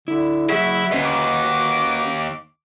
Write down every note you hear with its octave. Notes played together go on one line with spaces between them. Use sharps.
D3 E4
F#3 E4 F#4 G#4 E5
D#2 C#4 B4 D#5
D6